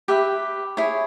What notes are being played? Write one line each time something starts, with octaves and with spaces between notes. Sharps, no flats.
G4 B4 E5
E4 G#4 C#5